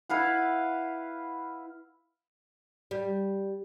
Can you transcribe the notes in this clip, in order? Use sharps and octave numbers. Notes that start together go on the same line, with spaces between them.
E4 B4 F5 F#5
G3